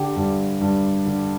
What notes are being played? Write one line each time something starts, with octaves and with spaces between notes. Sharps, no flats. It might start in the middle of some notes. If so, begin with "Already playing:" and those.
Already playing: D3 G4
G2
G2
D3